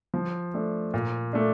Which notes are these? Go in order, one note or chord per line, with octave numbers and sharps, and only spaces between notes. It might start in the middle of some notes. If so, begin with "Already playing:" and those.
F3
A3 D4
A#2
A3 D4